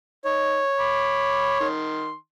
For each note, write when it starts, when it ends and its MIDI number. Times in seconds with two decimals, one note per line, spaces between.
0.25 0.61 63
0.25 1.67 73
0.79 1.59 83
0.79 1.59 86
1.60 2.15 51
1.60 2.15 84